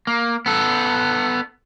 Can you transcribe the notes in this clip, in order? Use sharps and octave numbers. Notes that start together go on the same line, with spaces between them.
A#3
B3 A4